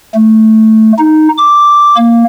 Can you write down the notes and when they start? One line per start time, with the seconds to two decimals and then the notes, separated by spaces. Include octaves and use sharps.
0.15 A3
0.99 D#4
1.38 D6
1.97 A#3